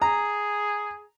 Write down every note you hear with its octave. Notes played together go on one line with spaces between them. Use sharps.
G#4 A#5